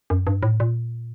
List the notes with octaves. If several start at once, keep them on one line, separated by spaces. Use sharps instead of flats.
F#2
G2
A2
A#2